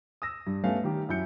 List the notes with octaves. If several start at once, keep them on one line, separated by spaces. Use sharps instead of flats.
D#6 E6 A#6
G2
G2 A3 B3 C#4 F5
D#3 G3 G4
F#2 E4 G6 C#7